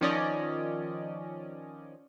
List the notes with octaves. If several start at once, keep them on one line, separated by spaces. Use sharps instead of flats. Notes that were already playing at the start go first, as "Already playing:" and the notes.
D#3 F3 C#4 D5 D#5